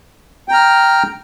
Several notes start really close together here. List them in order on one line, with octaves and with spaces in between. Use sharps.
G5 A#5 F6